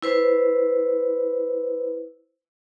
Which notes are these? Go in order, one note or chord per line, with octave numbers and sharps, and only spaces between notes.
E4 B4 C5